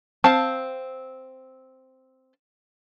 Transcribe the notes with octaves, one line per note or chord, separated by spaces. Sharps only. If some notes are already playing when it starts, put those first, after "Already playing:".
C4 F5 A5